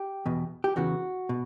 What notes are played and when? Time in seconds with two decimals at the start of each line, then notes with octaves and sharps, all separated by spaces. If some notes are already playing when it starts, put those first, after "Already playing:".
Already playing: G4
0.26 E2 B2
0.64 G4
0.76 E2 C#3 E3 F#4
1.29 B2